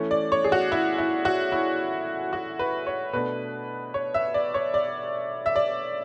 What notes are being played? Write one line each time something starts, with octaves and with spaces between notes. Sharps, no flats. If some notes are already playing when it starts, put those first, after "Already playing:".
Already playing: E3 A3 C#4
D5
C#5
G#4
F#4
E4
E4
F#4
E4
F#4
B4
C#5
B2 A3 D4 B4
C#5
E5
D5
C#5
D5
E5
D5